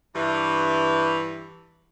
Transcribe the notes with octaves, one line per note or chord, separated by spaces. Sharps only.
G2 E3